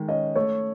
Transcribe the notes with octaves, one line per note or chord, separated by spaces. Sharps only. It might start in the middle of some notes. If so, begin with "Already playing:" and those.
Already playing: D#3 G#3
C#4 D#5
A3 C#5